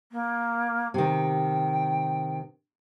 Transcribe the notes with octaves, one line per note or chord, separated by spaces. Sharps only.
A#3
C3 D#3 G5